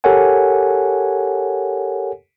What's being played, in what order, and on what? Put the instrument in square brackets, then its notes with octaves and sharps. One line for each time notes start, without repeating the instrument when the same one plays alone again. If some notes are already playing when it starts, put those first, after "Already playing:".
[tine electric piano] G4 A4 A#4 C#5 F#5 G#5